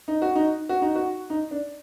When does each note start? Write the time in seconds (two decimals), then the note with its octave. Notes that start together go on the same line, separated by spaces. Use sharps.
0.08 D#4
0.22 F#4
0.36 D#4
0.69 F#4
0.82 D#4
0.96 F#4
1.30 D#4
1.51 D4